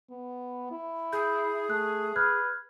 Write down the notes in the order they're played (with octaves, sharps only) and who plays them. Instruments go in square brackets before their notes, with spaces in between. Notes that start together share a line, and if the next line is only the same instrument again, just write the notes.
[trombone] B3
E4
[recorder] G#4 [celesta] G6
[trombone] A3 [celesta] F#6
[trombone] B4 [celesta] F6 F#6 G#6